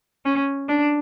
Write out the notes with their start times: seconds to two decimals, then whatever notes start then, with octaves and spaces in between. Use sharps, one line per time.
0.25 C#4
0.68 D4